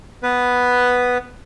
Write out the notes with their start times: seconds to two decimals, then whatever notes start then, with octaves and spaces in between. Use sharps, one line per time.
0.23 B3 B4